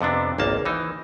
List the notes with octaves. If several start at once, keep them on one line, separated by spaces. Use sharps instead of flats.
F2 C3 B3 D4
G#1 C#2 A#3 A5
E3 D#4